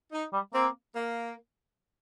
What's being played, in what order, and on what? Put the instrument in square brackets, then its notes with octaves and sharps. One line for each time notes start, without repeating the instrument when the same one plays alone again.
[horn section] D#4
[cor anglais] G3
[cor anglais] A#3 [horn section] C4
[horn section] A#3